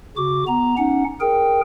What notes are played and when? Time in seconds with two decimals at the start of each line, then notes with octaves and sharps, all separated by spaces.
0.17 C#3 F#4 D6
0.48 B3 A#5
0.78 C#4 D#4 F#5
1.20 G#4 A#4 G5